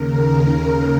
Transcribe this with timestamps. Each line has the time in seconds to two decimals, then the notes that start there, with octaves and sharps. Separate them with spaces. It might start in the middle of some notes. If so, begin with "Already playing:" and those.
Already playing: D#2 C#3 A#4